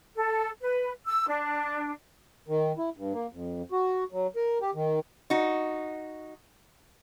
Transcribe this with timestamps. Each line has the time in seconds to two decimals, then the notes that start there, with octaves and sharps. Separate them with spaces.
0.16 A4
0.61 B4
1.06 E6
1.28 D4
2.48 D#3
2.78 E4
2.97 G2
3.13 A#3
3.33 F2
3.72 F#4
4.12 F#3
4.36 A#4
4.61 G4
4.75 D#3
5.30 D#4 F#4